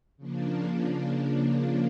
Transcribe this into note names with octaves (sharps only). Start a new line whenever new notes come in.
C#3 F3 A#3 D4